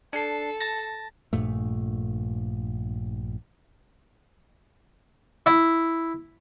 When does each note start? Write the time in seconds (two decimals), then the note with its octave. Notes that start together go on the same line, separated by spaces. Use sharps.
0.13 D4 A4 C7
0.61 A5 A6 A#6
1.33 A#1 G2 A#2 A3
5.46 E4